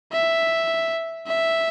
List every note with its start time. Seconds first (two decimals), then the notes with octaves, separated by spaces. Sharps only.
0.13 E5
1.27 E5